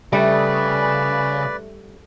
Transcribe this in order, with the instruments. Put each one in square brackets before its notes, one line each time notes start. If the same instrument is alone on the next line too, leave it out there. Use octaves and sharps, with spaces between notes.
[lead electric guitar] C#3 [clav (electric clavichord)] G3 [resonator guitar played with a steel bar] A3 [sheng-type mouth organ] B4 D5